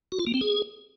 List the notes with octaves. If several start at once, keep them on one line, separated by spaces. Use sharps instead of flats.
F#4
F4
A#3
C4
G#4